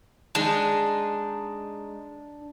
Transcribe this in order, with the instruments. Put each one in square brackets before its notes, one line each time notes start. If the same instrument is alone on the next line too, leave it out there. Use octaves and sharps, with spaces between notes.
[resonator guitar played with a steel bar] G#3 D#4 [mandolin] D4